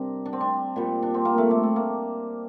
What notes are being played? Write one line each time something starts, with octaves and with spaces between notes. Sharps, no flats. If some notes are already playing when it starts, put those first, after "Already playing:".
Already playing: C3 G3 C4 D4 A#4
D4
C4
D4
A#2 G3
D4
C4
A#3
A3
A3
A3
A#3